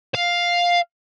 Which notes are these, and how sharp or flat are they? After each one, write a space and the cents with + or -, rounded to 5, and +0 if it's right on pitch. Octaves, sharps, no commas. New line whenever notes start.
F5 +5